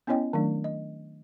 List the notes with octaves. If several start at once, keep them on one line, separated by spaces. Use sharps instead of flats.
B3 C#4 E4 C#5 D#5 G5
D#3 F#3 A3 D4
D#5